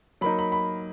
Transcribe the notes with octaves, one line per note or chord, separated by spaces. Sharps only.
F#3 A#3 D#4 B5
B5
B5